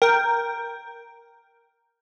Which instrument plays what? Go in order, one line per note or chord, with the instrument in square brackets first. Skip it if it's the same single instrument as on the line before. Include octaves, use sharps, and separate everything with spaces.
[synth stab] A#4 G5